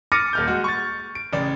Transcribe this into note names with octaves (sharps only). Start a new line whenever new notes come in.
D6 F6 A6 A#6 C#7 D#7
D#1 F6 G6
G#3 F#4
C#6 A6
D7
A1 C#3 D5